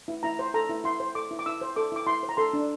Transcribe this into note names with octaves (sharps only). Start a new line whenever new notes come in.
E4
E4 A#5
C5
A4 A#5
E4
E4 C6
C5
A4 D6
E4
D6
E4 E6
C5
A4 D6
E4 D6
E4 C6
C5
A#5
A4 C6
D4